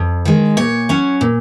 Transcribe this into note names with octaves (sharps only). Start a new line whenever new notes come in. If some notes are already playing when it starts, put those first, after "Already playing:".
Already playing: F2
D#3 G#3
A#2 C#5
F#3 C#4
A#2